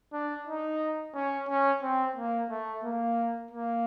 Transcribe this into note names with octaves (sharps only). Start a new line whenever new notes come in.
D4
D#4
C#4
C#4
C4
A#3
A3
A#3
A#3